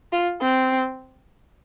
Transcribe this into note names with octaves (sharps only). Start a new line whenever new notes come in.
F4
C4